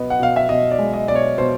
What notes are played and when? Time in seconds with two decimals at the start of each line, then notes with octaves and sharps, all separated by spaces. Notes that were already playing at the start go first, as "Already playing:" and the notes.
Already playing: B2 B3 D#5
0.10 F#5
0.20 B2 F5
0.36 E5
0.49 B2 D#5
0.71 D5
0.79 G#3
0.93 D#5
1.08 B2 D5
1.15 C#5
1.38 B2 C5